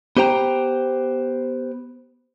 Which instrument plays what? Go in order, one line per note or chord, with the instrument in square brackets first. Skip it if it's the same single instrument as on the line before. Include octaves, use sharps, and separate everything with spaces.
[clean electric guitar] B3 G4 C5 G5 A#5